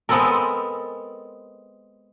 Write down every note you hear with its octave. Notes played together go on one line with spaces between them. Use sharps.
G#3 B3 C4 A4 A#4